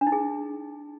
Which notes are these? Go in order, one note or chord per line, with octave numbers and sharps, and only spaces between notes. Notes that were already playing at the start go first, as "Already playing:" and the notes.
D4
D#4
G#4